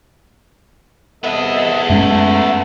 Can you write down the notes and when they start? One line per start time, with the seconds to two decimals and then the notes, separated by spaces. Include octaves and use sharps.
1.24 C2 B3 A4 D#5 E5
1.90 F#2 G#3 A3 C#4